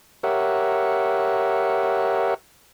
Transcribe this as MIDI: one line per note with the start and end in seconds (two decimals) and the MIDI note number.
0.23 2.34 67
0.23 2.34 70
0.23 2.34 73
0.23 2.34 76
0.23 2.34 78